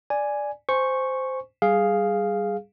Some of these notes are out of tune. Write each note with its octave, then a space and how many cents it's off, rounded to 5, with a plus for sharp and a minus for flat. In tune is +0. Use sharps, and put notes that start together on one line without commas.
D5 +0 G#5 +0
C5 -10 G#5 +0 C#6 -10
G3 +0 G#4 +0 F5 +0